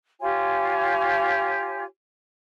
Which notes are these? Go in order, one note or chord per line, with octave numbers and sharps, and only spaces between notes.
F4 G4 C#5 G#5